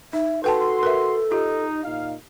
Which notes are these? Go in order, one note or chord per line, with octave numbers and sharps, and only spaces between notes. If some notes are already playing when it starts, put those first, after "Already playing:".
D#4 E5
F#4 A4 B4 G5 A5 C6
A#4 B4 E5
D#4 F4 G4
A#2 D#4 F5